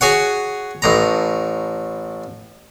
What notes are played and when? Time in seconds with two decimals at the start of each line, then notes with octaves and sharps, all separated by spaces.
0.01 F#4 G#4 C#5 F#5
0.82 A1 A2 A#5